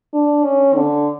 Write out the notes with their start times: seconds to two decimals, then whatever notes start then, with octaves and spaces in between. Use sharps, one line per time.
0.14 D4
0.45 C#4
0.75 D3